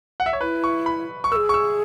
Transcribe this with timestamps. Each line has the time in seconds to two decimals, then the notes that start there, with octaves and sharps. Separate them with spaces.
0.20 F#5
0.26 E5
0.33 C#5
0.41 E4 B4
0.64 C#6
0.86 B5
1.24 C#6
1.31 G#4 A#4 E6
1.49 C#6
1.54 E6